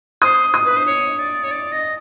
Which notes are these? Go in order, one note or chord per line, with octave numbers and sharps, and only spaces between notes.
C5 D#6
D#6
B4
C5
C#5
D5
C#5
D5
D#5